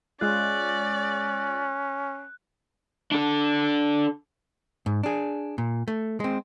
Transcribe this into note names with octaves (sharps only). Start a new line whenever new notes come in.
G#3 C#4 F4 D5 F#6
D4 A4
G#2
D4 G#4
A#2
A3
G#3 C4